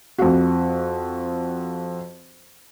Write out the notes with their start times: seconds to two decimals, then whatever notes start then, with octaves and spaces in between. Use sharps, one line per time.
0.18 F2 F#4